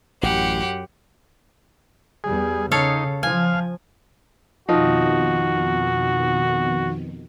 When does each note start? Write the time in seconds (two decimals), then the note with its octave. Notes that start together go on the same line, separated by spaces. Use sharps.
0.23 A1 F#2 G4 F#5
2.24 E2 G3 G#4
2.72 C#3 D#4 A4 C#5 F5
3.23 F3 F5 G#5
4.69 F2 B2 D#3 F3 D#4 F#4